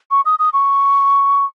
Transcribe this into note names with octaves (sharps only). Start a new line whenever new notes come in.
C#6
D#6
D#6
C#6